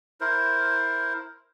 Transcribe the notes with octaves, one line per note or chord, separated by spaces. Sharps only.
E4 A#4 C5